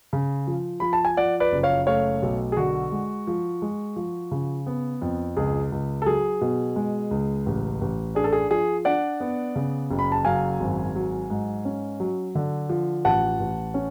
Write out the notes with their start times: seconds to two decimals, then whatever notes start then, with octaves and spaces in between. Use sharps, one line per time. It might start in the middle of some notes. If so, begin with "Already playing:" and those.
0.13 C#3
0.47 F3
0.80 F3 B5
0.93 A5
1.05 G#5
1.17 F3 D5 F#5
1.40 B4 D5
1.52 F#1
1.63 C#5 F5
1.87 A3 C#5 F5
2.22 B1
2.52 G#4
2.57 D3 F#4
2.92 G#3
3.27 F3
3.62 G#3
3.96 F3
4.31 C#3
4.66 B3
5.02 F2
5.37 C#2 G#4
5.72 C#2
6.02 A4
6.06 F#3 G#4
6.41 B2
6.76 G#3
7.11 C#2
7.46 A1
7.81 A1
8.15 D4 G#4
8.24 A4
8.32 G#4
8.51 F3 G#4
8.85 D4 D5 F#5
9.20 B3
9.56 C#3
9.90 F#1
9.99 B5
10.12 A5
10.25 F#2 F5 G#5
10.60 G#1
10.95 F#3
11.30 G#2
11.65 C#4
12.00 F#3
12.35 D3
12.70 F3
13.05 A1 F#5 A5
13.40 A1
13.74 C#4